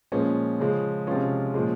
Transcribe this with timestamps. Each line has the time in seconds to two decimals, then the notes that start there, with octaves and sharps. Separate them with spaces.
0.12 A#2 F3 G#3 C#4
0.60 C#3 F3 G#3
1.07 C3 F3 G#3 C#4 F4
1.54 A#2 F3 G#3